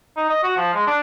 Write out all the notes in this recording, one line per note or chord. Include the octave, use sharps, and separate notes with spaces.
D#4
D#5
F#4
F3
G#3
D4